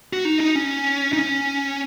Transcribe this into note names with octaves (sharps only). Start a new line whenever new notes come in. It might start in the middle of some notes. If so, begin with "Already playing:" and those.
F#4
D#4
D#4
C#4
D#4
C#4